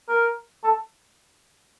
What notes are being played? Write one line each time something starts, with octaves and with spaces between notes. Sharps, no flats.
A#4
A4